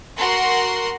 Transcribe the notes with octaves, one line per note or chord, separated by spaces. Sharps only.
F#4 A#4 F#5 C6